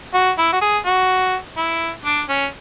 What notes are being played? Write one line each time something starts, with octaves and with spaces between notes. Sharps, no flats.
F#4
E4
F#4
G#4
F#4
E4
D4
C#4